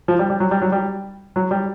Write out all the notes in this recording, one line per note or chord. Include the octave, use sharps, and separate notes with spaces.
F3
G3
G3
F#3
G3
F#3
G3
F#3
G3